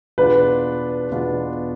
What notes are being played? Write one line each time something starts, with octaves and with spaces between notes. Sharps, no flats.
E2 B2 B3 D4 F4 B4
E2 B2 B3 D4 F4